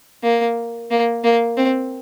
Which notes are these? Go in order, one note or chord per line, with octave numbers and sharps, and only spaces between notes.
A#3
A#3
A#3
C4